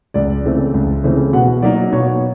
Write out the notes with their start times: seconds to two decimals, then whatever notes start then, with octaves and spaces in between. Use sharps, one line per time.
0.14 C#2 D5
0.44 C#3 E3 A3 C4
0.74 C#2
1.04 C#3 E3 A3 C4
1.33 B2 F#5
1.62 F#3 A#3 D#4 D5
1.93 B2 C#5